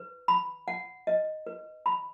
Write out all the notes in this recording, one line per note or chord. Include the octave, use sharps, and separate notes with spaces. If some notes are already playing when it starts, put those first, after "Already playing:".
Already playing: B4
B5
F#5
D#5
B4
B5